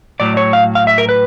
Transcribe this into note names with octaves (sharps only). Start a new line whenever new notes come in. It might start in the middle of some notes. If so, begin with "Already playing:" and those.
A2 F#3 D5
C#5
F5
F5
E5
A#4
B4